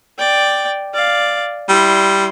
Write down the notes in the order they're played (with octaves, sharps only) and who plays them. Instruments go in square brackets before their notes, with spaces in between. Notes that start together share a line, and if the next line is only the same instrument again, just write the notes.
[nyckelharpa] D5 G5
D5 F5
[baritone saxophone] G3 [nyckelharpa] E4 C6